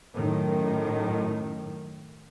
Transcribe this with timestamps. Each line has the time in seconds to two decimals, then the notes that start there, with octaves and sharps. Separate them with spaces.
0.13 F#2 A2 D#3